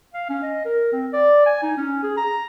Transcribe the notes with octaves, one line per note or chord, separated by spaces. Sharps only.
F5
C#4
D#5
A#4
C4
D5
G#5
D#4
C#4
G#4
A#5